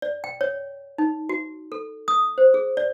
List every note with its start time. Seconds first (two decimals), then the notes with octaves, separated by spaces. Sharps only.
0.02 D5
0.24 G5
0.41 C#5
0.98 D#4
1.29 F#4
1.72 A4
2.08 D#6
2.38 C5
2.54 G#4
2.77 D5